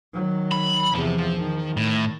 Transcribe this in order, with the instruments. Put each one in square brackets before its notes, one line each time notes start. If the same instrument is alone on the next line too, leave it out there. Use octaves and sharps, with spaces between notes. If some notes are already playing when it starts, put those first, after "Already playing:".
[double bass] D#3 F#3
[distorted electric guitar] B5
[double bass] E2 C3 [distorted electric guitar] F3
[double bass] D#3
[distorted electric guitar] A2